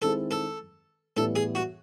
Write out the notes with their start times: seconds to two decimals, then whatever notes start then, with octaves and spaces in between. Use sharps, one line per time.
0.02 D#3 G#3 C4 E4 G#4 A4
0.31 A4
1.16 A2 E3 G3 B3 A4
1.36 G#4
1.55 F#4